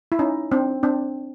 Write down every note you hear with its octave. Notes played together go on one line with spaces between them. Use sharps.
E4
C#4 D#4
C4 D4
C4 D4